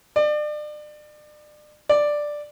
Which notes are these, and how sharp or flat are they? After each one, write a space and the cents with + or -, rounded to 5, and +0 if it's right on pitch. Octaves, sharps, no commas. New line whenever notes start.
D5 +35
D5 +5